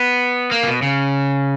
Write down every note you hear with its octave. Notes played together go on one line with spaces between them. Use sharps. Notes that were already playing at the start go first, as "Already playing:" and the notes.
Already playing: B3
A#3
C#3
B2
C#3